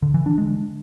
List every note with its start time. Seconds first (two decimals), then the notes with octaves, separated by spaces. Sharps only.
0.02 D3
0.14 E3
0.26 D4
0.38 G#3